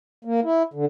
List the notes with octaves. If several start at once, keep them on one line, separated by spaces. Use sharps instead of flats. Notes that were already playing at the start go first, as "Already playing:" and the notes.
A#3
E4
D3